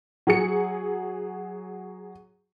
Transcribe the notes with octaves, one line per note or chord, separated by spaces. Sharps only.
F#3 G#4 C#7